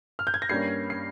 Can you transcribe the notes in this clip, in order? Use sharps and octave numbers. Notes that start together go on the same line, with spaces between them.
F6
G6
G#6
A#6
G2 G3 A#3 C#4 C7
C7